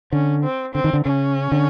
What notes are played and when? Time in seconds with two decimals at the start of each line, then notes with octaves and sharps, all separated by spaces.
0.12 D3 C#4
0.44 C4
0.74 D3 C4
0.84 D#3
0.93 D3
1.05 C#3 C#4
1.52 D3